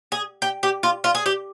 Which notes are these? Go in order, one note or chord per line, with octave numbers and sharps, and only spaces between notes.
G#4
G4
G4
F4
F4
G#4
G4